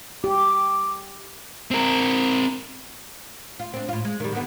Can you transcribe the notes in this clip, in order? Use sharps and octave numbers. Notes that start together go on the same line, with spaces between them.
G4 D6
C4 A#4
F4
C4 D4
A2 F4
G#3
D#3 G3
D3 D#3 B3